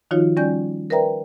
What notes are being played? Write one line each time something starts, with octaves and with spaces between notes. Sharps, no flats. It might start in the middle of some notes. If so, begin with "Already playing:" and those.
D#3 F3 D#4 F4 F#4 C#5
G3 C#4 D5 G#5 G6
A#4 B4 D5 E5 G5 A#5